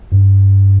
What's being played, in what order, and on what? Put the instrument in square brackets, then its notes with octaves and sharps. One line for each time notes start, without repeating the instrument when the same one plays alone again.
[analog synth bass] G2